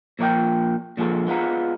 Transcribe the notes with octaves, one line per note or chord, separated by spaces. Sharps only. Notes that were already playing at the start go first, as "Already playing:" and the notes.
A#2 F3 A#4 D5 G5
A#2 F3 G#3 A4
G#3 B3 F4 A#5